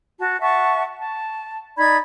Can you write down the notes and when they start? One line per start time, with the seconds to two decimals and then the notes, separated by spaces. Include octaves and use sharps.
0.20 F#4 A5
0.41 E5 F#5 A5 C#6
0.99 A5
1.78 D#4 D5 B5 G#6